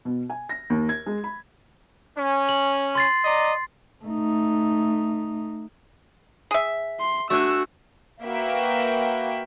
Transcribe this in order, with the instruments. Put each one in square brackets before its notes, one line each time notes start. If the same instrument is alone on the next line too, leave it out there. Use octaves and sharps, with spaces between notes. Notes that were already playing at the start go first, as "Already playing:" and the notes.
[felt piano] B2
G#5
A#6
D#2
G#6
G#3
B5
[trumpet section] C#4
[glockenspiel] F#7
C6 A6 C7
[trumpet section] D5 D#5 A#5
[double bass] A3 D#4
[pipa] G#4 E5
[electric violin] C6
[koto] A3 D4 G#5 [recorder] F#4 [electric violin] E6
[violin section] A#3 F#4 B4 E5 G5